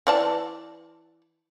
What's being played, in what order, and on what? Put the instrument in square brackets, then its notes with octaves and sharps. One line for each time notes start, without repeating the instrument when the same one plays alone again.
[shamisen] E3 D5 A5